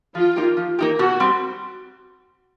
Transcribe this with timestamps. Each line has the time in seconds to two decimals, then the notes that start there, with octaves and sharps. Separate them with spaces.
0.15 F3 F4
0.36 A#3 D#4 G4
0.57 F3
0.79 A#3 D#4 G4
0.99 B2 F#4
1.20 G3 C4